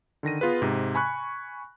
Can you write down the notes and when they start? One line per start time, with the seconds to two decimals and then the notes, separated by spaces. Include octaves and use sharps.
0.23 D3 D#3 A#6 D#7
0.41 B3 F4 G#4 B4
0.62 G#2 C3
0.95 G#5 B5 C#6 F#6